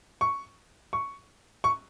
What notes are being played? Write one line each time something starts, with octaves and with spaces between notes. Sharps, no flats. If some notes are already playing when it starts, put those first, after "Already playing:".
C#6
C#6
C#6